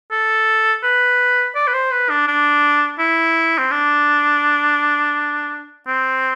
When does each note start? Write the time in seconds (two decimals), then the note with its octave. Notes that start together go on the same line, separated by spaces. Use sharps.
0.12 A4
0.84 B4
1.55 D5
1.67 B4
1.74 C5
1.91 B4
2.10 D4
2.28 D4
2.99 E4
3.58 C4
3.71 D4
5.87 C4